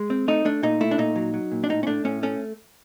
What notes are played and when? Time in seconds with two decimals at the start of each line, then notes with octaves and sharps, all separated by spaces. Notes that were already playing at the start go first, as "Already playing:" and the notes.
Already playing: G#3
0.10 C4
0.28 A3 D#4
0.45 A3 D4
0.63 A#2 D#4
0.81 A3 E4
0.91 D4
0.98 A#2 D#4
1.16 F#3
1.34 F#3
1.52 A#2
1.64 D4
1.69 A2 D#4
1.83 C#4
1.87 A3 D4
2.05 A2 C#4
2.23 A3 C#4